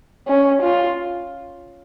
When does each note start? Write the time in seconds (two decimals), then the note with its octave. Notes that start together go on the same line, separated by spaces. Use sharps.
0.27 C#4
0.62 F4